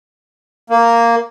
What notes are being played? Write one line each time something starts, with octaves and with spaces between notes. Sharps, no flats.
A#3